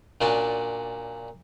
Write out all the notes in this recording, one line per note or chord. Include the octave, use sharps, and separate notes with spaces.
A#2 C#4 D4 F#4 F#5 A5